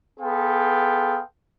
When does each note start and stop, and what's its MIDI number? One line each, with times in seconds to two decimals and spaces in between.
0.20 1.21 59
0.20 1.21 68
0.20 1.21 69
0.20 1.21 77
0.20 1.21 79
0.20 1.21 84